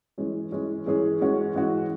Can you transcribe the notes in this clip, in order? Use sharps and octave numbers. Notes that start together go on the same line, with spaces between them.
E3 G#3 C#4 G#4
E3 G#3 C#4 G#4
E3 G#3 C#4 G#4
E3 G#3 C#4 F#4
E3 G#3 C#4 F#4